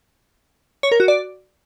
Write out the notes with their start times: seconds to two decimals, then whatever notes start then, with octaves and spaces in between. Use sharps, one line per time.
0.83 C#5
0.92 A#4
1.00 F#4
1.08 D5